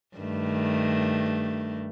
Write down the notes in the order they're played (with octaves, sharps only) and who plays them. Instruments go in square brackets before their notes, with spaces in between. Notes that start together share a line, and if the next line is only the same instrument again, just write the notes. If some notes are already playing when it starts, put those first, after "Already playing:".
[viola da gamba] G2 D#3 A3